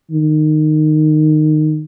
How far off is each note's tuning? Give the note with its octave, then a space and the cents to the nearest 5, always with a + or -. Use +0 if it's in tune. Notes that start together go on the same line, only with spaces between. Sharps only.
D#3 -15